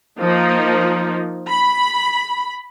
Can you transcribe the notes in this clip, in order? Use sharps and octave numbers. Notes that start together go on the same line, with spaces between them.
F3 A#3 D#4
B5